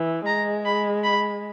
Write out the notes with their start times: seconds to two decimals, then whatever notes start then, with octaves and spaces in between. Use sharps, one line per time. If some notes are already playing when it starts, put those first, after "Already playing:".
Already playing: E3
0.26 G#3 A#5
0.65 B5
1.03 B5